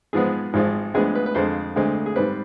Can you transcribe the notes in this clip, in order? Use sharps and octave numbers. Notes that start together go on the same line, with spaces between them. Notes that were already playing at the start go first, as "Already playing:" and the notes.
G#2 F3 G#3 B3 G#4
G#1 G#2 F3 G#3
D2 D3 F3 G#3 B3 G#4
B4
B4
F2 D3 G#3 C5
D2 D3 G#3 C4
G#4
G#2 G3 C4 B4